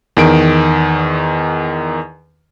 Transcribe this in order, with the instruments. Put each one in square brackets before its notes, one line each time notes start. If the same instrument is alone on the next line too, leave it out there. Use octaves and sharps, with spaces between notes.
[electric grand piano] E2 D#3 D7